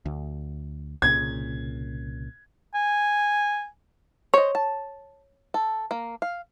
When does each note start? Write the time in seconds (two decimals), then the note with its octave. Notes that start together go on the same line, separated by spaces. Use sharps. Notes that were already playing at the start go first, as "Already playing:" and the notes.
0.06 D2
1.02 C2 A#2 C#3 G#6
2.75 G#5
4.34 C5 C#5 D#5
4.55 A5
5.54 A4
5.91 A#3
6.22 F5